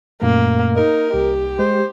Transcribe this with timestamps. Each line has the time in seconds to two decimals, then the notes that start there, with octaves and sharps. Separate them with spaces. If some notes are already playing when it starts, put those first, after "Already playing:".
0.22 F#2 A#2 A3 A#3
0.77 D#4 A#4
1.14 C2 G4
1.59 G#3 C5